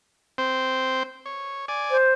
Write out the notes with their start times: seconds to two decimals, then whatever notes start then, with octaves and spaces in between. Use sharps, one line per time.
0.38 C4 C5
1.26 C#5
1.68 D5 G#5
1.91 C5